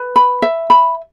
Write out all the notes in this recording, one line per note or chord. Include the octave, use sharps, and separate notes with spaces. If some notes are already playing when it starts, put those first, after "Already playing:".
Already playing: B4
B5
E5
B5